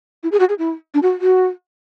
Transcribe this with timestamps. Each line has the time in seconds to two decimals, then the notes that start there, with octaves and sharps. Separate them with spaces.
0.23 E4
0.32 G#4
0.40 F#4
0.49 G#4
0.58 E4
0.94 D4
1.02 F#4
1.21 F#4